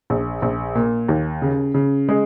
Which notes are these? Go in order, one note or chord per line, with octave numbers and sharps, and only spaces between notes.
A#1
A#1
A#2
D#2
C#3
C#3
G#3